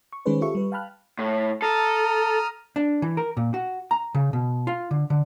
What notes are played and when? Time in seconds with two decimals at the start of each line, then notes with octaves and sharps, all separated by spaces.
0.13 C#6
0.26 D#3 G#3 C#4 G#4 B4 C5
0.41 F4 G4 A4 E5 C#6
0.55 G3 B4
0.72 F5 G5 A5 B5 F6 F#6
1.19 A2
1.62 A4 A#5 D#6 F6
2.76 D4
3.02 E3
3.17 A#4
3.37 A#2
3.54 F#4
3.91 A#5
4.15 C#3
4.33 B2
4.67 F4
4.91 D3
5.10 D3